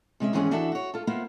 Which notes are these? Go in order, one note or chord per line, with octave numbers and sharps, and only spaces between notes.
C3 G#3 C#4 E5
D#2 G#2 E3 G#3 C#4 G#4
E2 E3 D4 F#4 A4 E5
F#4 C#5
F4 A4
A#3 B3 E4 F4 C5